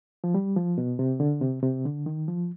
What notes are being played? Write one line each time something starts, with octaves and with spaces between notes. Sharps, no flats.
F3
G3
F3
B2
C3
D3
C3
C3
D3
D#3
F3